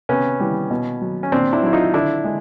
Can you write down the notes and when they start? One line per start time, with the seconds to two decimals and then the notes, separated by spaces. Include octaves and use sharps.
0.09 C3 B3 C#4
0.40 E3 G3
0.71 B2
1.02 F#3
1.23 C#4
1.32 A#2 C4 D4
1.53 D4 E4
1.63 F#3 E4
1.73 D#4 F4
1.94 D3 D4 E4
2.24 G#3